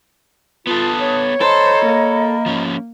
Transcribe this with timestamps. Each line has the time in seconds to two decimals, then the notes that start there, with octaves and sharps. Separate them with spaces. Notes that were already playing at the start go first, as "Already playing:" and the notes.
0.67 B3 F4 A4 A5 D#6 F#6
1.00 C#5
1.41 A4 C5 D#5 A#5 B5
1.86 A#3
2.46 F3 C#4